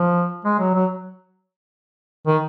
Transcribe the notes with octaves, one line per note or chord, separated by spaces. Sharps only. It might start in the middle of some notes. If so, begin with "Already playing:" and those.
Already playing: F3
G#3
F#3
F#3
D#3